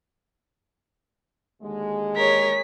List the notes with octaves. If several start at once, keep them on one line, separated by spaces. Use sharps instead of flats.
D#2 D3 G#3
G#4 A#4 C#5 B6